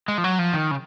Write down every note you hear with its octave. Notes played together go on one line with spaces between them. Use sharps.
G#3
F3
F#3
F3
D#3
C#3